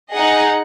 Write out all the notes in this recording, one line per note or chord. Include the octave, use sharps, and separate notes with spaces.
D#4 G#4 D#5 F#5